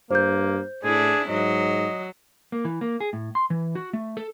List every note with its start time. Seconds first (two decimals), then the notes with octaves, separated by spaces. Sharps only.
0.11 G2 A#3 C5 G6
0.84 A2 D4 E4 G#4
1.29 G#2 F#3 D#5
2.52 A#3
2.65 E3
2.81 A#3
3.00 G#4
3.13 A2
3.35 C6
3.50 E3
3.75 F#4
3.93 A3
4.17 A4